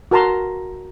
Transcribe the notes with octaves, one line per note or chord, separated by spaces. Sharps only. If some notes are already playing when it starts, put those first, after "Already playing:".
F#4 A#4 A5 A#5 C6